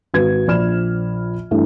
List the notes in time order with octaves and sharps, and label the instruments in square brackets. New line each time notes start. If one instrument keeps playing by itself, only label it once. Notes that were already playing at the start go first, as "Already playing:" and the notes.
[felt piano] G#1 F#4 B4 G#6
A#1 F3 D5 B5 F6 E7
G2 E3 A3 E4